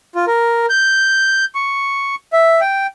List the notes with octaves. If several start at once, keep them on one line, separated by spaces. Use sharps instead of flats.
F4
A#4
G6
C#6
E5
G5